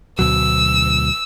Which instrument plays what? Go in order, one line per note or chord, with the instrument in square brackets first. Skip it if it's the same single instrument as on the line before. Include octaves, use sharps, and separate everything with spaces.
[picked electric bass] D2 B2 F#3 [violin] E6